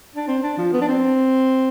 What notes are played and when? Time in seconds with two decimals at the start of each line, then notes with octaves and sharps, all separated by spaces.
0.16 D4
0.28 C4
0.43 D4
0.58 F3
0.73 B3
0.81 D4
0.88 C4